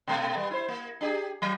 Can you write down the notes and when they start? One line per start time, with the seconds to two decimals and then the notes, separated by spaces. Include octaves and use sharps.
0.07 B2 A3
0.37 G3 B3
0.51 E4 C5
0.68 A#3
1.01 D4 G4 G#4
1.42 F#3